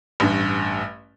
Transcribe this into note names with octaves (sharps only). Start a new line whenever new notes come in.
A1 G2